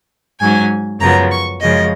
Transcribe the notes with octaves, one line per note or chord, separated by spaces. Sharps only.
G#2 F#3 C#4 G#5
F#2 C#3 F3 B3 A#5
C#6
F#2 C#3 F3 G#3 D#5